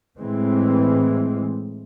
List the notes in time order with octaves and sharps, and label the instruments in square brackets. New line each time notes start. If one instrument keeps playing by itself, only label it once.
[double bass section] A2 E3 G#3 C4